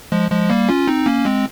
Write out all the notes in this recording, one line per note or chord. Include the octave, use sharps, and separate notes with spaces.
F3 G#3
F3 G#3
G3 A#3
C#4 F4
C4 D#4
A#3 C#4
G#3 C4